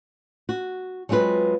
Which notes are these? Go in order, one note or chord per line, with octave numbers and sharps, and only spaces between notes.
F#4
F#3 G#3 C4 F4 B4